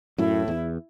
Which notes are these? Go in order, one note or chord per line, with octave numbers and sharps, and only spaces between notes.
F#2 A2 E4
E2